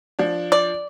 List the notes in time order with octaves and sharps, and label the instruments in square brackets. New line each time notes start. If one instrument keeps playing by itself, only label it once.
[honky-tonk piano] F3 D4
[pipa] D5